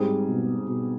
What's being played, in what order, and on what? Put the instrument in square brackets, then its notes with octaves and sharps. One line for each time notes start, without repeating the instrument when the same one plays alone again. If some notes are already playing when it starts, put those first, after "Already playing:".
Already playing: [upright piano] G#2 G3 C4 D#4 G#4
[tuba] B2
B2